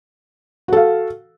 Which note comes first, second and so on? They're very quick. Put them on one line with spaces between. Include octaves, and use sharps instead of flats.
F#4 A4 F5